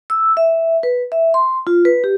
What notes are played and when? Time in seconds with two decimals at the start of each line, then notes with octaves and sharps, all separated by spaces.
0.10 E6
0.37 E5
0.83 B4
1.12 E5
1.34 C6
1.67 F4
1.85 B4
2.04 G4